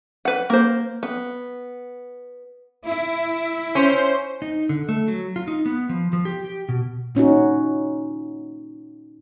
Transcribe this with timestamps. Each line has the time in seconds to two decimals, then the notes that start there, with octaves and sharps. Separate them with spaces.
0.25 B4 F#5
0.50 A#3 C5
1.03 B3
2.84 E4
3.75 C#4 C5
4.42 D#4
4.69 D3
4.89 A3
5.08 F#3
5.36 F4
5.48 D#4
5.66 B3
5.89 F3
6.13 F3
6.25 G4
6.44 G4
6.69 B2
7.15 A#2 C#4 D#4 F#4